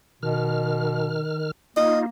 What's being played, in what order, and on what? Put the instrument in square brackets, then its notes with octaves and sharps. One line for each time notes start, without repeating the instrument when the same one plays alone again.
[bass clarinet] B2 [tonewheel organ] D#3 F6
[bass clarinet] A#3 [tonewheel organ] D#4 F4 [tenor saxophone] D#5